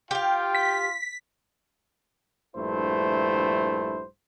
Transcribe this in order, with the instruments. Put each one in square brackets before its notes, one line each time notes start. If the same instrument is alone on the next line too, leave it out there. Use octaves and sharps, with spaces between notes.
[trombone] F4 [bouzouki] G4 F5 [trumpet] G5
[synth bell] B6
[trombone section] A#1 G2 A3 E4 C5